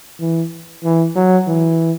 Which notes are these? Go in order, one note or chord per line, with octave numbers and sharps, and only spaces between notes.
E3
E3
F#3
E3